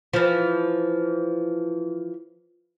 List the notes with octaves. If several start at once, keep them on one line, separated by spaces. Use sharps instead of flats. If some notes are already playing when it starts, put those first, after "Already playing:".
E3 F3